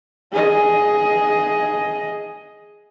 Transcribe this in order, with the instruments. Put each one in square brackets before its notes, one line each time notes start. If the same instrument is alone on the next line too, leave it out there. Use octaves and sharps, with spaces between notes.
[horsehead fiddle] G#4 D#5